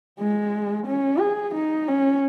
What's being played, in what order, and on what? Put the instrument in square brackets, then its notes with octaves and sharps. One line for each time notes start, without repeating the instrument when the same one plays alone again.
[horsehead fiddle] G#3
C#4
G#4
D#4
C#4